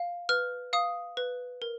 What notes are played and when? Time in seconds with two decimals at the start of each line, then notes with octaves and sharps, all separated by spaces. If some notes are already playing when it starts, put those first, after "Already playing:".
Already playing: F5
0.29 B4 F6
0.73 F5 D#6
1.17 B4
1.62 A#4